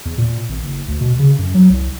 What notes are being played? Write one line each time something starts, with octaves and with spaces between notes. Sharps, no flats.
E2
A#2
G#1
F#1
D2
B2
C#3
F#2
F#3
C2